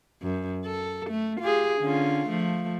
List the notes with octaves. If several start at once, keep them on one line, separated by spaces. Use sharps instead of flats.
F#2
A4
A3
F4 G4 G#4
D3 C#4 F4
F3 A3